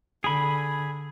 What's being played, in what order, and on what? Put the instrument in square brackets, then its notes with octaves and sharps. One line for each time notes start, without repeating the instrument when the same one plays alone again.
[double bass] D3 [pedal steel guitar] G#4 B5